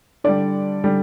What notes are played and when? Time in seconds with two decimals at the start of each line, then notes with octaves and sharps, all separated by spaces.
0.24 D3 G3 D5
0.84 D3 G3